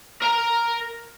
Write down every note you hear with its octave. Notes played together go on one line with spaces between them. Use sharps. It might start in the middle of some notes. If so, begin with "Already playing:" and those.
A#4 A#5